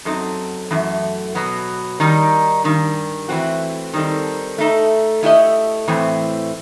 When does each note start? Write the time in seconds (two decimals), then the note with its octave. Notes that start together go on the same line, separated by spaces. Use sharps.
0.05 F#2 F#3 C4 D#4 A4
0.71 F#2 E3 A3
1.35 B2 F#3 B3
2.00 D#3 G3 D#4
2.64 G2 D#3 G3
3.29 E3 A3 C4 F#4
3.93 D#3 G3 C4 D#4 A4
4.58 A3 D#4 A4
5.23 A3 E4 G4 D#5
5.88 A2 E3 A3 C4